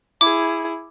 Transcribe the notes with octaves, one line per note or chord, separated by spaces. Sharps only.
E4 G#4 D6